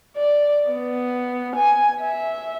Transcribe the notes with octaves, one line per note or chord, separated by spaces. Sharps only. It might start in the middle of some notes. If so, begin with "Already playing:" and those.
D5
B3
G#5
E5